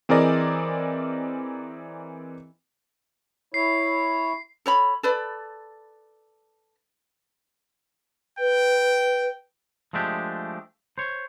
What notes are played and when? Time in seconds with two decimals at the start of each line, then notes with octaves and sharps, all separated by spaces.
0.09 E3 C4 G#4 A#4 D5 D#5
3.54 E4 C#5 C7
4.66 A4 C#5 B5
5.03 A4 B4 D5
8.39 B4 G5
9.93 F3 G#3 A3 D4 G4
10.98 C5 C#5